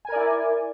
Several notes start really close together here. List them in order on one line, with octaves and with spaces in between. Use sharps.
G#5 A#4 D5 E4